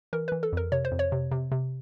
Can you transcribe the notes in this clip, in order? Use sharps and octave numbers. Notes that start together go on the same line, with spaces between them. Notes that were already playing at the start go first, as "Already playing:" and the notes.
E3 A#4
E3 B4
A4
F2 A#4
C3 C#5
C5
F2
C#5
C3
C3
C3